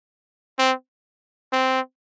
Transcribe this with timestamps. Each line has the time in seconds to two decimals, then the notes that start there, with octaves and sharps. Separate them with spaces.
0.59 C4
1.52 C4